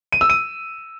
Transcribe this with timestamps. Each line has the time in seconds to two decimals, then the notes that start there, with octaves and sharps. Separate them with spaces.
0.12 D#7
0.21 E6
0.30 D#7